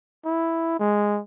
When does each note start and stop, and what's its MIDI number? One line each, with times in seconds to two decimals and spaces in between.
0.25 0.78 64
0.79 1.20 56